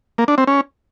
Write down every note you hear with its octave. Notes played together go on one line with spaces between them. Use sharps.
A#3
D4
C4
C#4